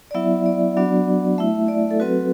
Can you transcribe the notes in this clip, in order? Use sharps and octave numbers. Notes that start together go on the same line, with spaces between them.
D5
F#3 B3 E4 E5
D5
F#3 B3 D4 F#4
A3 E4 E5
D5
A4
F#3 C4 F#4 B4